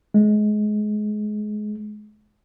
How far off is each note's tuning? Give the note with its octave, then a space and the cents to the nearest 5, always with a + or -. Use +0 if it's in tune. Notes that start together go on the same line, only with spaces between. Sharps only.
G#3 +25